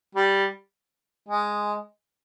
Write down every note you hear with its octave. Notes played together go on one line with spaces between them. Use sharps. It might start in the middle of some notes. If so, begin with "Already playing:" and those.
G3
G#3